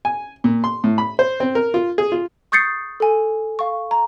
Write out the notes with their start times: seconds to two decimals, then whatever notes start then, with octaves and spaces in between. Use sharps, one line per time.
0.05 G#5
0.44 A#2
0.64 C6
0.84 A2
0.98 B5
1.19 C5
1.40 C4
1.55 A#4
1.74 F4
1.98 G#4
2.12 F4
2.52 C#6 D#6 G6 A6 C7 C#7
3.00 A4 G#5
3.59 F5 C#6
3.91 A#5